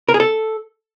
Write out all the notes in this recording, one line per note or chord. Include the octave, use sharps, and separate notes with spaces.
A#4
G#4
A4